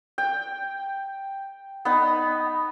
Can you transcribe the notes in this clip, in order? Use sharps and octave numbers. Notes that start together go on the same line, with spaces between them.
G5
B3 D#4